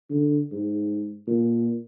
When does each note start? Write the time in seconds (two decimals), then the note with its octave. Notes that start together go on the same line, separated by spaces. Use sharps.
0.10 D3
0.52 G#2
1.27 A#2